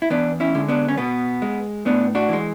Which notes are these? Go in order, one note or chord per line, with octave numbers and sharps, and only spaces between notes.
E4
E2 B3 D4
C#4 E4
D3 G#3
B3 D4
C#4
B2 B3
G#3
A2 B3 D4
D4 F#4
E3 G#3